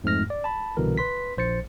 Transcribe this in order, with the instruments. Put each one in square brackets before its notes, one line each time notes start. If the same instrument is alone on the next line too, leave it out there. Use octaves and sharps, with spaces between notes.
[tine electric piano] F2 G#2 A3 F6 A#6
D5
A5 B5
C2 B2 D3 E3 A#4
B4 C6 B6
A#1 C5 A6 C#7